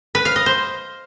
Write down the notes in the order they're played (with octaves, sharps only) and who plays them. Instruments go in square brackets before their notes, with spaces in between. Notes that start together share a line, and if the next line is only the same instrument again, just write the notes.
[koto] B4
F5
D#5
C5